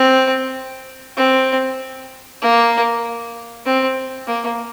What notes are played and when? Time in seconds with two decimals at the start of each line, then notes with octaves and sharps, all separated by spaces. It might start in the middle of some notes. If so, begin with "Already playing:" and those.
Already playing: C4
1.16 C4
2.42 A#3
3.66 C4
4.27 A#3